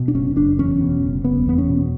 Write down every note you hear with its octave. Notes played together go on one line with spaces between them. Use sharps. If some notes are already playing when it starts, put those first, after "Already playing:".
Already playing: B2
D4
F#1 C#4
F#1 D4
E2 C#4
B2
F#1
F#1 B3
E2 B3
C#4
B2